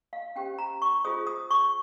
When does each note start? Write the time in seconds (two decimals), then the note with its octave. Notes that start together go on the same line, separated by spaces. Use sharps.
0.13 F5
0.36 C#4 G4 C5 G5
0.58 A#5
0.82 C#6
1.05 F4 G#4 C5 D#6
1.27 D#6
1.51 C#6